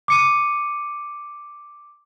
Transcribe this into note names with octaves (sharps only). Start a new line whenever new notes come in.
D6 C#7 D#7